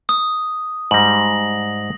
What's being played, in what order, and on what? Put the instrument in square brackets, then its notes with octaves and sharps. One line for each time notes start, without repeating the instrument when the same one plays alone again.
[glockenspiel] D#6
[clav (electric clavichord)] G#2 G3 [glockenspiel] A#6 F#7